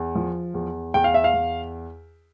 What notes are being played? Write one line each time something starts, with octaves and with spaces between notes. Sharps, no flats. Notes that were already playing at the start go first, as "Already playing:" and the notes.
Already playing: E2
F3
E2
E2 G5
F5
E5
F5
E2